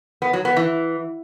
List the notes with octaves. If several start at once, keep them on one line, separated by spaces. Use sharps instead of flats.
B3
F#3
B3
E3